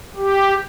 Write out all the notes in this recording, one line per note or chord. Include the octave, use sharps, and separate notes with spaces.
G4